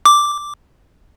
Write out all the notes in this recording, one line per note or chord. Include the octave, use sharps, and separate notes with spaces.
D6